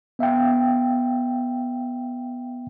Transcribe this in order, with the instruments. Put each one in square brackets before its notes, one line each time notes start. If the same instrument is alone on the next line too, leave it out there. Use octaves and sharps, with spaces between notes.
[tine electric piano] B3 E5 F5 G5